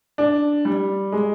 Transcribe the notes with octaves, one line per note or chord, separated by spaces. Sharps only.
D4
G3
G#3